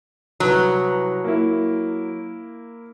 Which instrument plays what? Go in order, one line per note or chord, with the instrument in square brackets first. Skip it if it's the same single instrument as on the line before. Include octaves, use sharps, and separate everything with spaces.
[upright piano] C2 B4 A#5 [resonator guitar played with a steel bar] F#3
[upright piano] A#3 E4